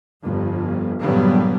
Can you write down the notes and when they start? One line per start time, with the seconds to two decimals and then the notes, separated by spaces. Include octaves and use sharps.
0.22 G1 F2
0.99 A#1 G2 D3 F#3 G3 B3